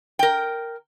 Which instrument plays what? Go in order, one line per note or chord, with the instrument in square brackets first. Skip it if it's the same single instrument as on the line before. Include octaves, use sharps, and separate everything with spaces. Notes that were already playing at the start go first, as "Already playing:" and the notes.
[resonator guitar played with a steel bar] A#4 G5